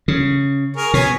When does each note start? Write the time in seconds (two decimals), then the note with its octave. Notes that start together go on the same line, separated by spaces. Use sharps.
0.08 C#3
0.77 G#4 A#4 C#6
0.94 B2 C#4 C#5 G#5